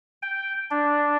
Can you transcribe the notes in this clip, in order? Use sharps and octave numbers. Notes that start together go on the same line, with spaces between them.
G5
D4